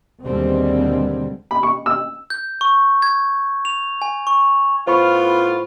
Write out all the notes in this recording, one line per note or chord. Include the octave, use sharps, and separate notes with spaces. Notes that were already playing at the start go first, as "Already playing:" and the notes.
D#2 B2 D3 G3 G#3 C4
B5
C#6
E6
G6
C#6
G#6
F7
G#5
C#6
A2 B3 F4 C5 B5 C#6